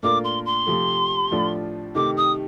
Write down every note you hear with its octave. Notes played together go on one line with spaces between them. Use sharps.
A#2 A3 D4 F4 A#4 D6
C6
C6
C3 F3 A3
A2 F3 A3 D4 F4
C3 D#3 A3 D6
D#6